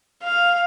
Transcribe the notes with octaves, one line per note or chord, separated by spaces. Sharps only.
F5